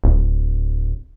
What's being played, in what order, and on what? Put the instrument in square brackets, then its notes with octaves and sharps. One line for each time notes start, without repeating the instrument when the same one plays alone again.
[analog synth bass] D1